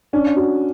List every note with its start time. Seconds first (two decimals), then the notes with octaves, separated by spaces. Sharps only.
0.13 C#4 D4
0.36 F#4